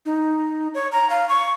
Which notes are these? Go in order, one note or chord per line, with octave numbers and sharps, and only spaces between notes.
D#4
C#5
A#5
F5
C#6